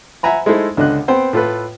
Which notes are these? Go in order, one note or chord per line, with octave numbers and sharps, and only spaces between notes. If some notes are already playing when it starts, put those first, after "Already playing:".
E5 F#5 G#5 A#5 B5
G#3 A3 D#4 E4 A4 C5
C#2 D3 D4 D#5 F#6
B3 C4 C5 G5
A2 F4 A4 B4